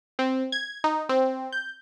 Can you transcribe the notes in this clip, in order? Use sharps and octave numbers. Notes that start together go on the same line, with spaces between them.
C4
G#6
D#4
C4
G6